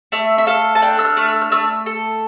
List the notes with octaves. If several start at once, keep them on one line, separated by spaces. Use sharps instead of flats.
A3 E5
E5
A4 F5
A5
D4 G5
E6
F6
A3
E6
F6
A3 E6
A4